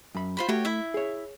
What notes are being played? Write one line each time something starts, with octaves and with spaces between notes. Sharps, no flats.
F#2 B5
F4 C5 B5
A3 F#4 G4 C#5
E4 E5
G#4 C#5